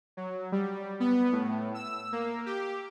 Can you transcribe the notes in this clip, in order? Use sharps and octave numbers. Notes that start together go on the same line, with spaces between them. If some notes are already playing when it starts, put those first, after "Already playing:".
F#3
G3
B3
A2
E6
A#3
G4